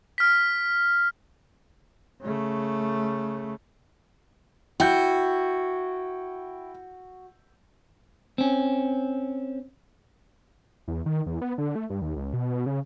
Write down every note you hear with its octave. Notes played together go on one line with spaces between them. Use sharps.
F6 B6
C#3 A3
E4 F#4 G5 G6
C4 C#4
E2
D#3
E2
B3
D3
A3
G2
D#2
C#2
B2
C#3